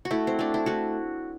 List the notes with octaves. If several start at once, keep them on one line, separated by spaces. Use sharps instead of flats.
F#4
A3 E4
C4
A3 D4
E4
A3 F#4